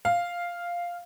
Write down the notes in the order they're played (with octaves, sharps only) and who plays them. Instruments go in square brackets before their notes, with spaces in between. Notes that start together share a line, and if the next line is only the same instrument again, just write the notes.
[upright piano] F5